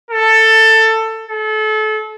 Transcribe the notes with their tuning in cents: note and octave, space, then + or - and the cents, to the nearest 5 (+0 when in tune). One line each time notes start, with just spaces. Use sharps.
A4 +15
A4 -30